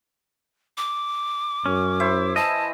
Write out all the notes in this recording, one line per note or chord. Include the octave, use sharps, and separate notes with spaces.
D6
F#2 C#4
E4 C5 E5
E3 D#5 A5